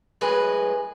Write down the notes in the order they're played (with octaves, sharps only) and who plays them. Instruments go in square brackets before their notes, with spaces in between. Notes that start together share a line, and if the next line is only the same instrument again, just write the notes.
[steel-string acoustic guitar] F#2 A2 F#3 G#3 B4 G#5